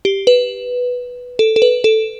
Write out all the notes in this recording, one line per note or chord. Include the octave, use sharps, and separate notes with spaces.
G4
B4
A4
A4
B4
A4